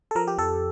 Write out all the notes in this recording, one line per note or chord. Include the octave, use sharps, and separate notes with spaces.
A4
F3 A#4
G4
F2 A4